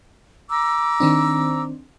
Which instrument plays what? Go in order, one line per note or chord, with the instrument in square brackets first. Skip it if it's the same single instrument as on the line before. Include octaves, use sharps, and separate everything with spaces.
[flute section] A#5 D6 E6
[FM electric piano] D#3 C4 D4